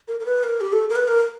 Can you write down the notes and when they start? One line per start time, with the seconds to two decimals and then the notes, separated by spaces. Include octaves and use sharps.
0.08 A#4
0.20 A#4
0.26 B4
0.44 A#4
0.61 G4
0.73 A4
0.90 A#4
0.96 B4
1.08 A#4